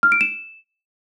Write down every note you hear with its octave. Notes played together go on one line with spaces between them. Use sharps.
F6
D7
E7